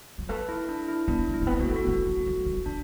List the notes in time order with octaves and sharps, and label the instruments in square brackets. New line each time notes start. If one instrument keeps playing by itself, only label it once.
[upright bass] F#3
[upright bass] A3 [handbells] B4
[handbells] E4
D4
E4
[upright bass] B3 [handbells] D4
[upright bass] A3
[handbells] E4
[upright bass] A3
B3
[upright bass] B3 [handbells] F#4
[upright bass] A3 [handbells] A4
[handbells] F#4
[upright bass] A3
F#3
F#3
E3
[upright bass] D3 [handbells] D4